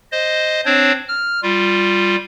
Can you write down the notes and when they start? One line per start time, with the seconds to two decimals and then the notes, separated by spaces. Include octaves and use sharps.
0.12 C5 D#5
0.65 C4 D4 C5 C#5
1.08 F6
1.43 G3 F4